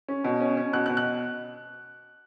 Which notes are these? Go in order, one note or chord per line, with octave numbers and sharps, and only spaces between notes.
C#4
B2
C#4
C#4
B2 F#6
F#6
B2
F#6